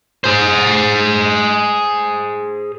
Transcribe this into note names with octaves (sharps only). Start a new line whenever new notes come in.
G#4 C5